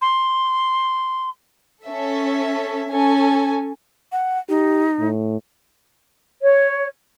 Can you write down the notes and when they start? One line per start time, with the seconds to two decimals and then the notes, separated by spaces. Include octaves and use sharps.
0.01 C6
1.86 C#4 A4 E5
2.88 C#4 A4 G#5
4.12 F#5
4.49 D#4 G4
5.00 A2
6.43 C#5